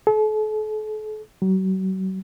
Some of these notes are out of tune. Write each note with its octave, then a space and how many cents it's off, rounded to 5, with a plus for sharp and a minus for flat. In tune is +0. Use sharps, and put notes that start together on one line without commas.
A4 -40
F#3 +40